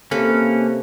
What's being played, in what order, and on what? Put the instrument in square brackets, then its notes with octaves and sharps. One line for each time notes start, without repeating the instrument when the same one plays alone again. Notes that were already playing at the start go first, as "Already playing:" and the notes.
[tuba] C3 [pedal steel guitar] A#3 C#4 [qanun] A4 B4